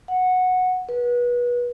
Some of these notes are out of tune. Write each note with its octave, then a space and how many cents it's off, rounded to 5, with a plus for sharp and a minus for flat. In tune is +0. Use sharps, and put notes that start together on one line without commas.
F#5 -10
B4 -30